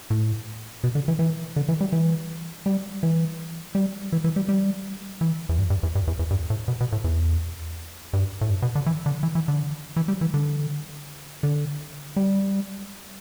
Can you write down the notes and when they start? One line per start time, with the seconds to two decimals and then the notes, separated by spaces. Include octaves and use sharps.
0.10 A2
0.84 B2
0.95 D3
1.08 E3
1.19 E3
1.56 D3
1.69 E3
1.81 G3
1.92 E3
2.66 G3
3.03 E3
3.75 G3
4.12 E3
4.24 E3
4.36 G3
4.49 G3
5.21 E3
5.49 E2
5.58 G2
5.70 G2
5.83 E2
5.95 G2
6.07 E2
6.19 E2
6.31 G2
6.50 A2
6.68 B2
6.80 B2
6.92 A2
7.04 E2
8.13 G2
8.41 A2
8.50 G2
8.62 B2
8.75 D3
8.86 E3
9.06 D3
9.23 E3
9.35 E3
9.48 D3
9.96 E3
10.08 G3
10.21 E3
10.34 D3
11.43 D3
12.16 G3